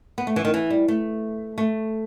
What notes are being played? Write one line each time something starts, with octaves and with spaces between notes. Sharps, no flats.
B3
A3
E3
D#3
E3
G3
A3
A3